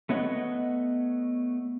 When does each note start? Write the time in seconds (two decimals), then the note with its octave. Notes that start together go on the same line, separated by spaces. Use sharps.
0.09 A3 B3 C#5 D#5 F#5